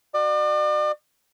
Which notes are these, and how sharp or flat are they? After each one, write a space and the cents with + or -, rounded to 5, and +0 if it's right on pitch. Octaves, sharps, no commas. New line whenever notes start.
F#4 +0 D5 +40